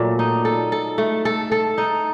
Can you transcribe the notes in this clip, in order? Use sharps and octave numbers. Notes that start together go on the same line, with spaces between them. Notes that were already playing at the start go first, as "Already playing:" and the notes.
Already playing: A#2 F#3 A3
D#4
A4
A4
A3
A4
A4
D#4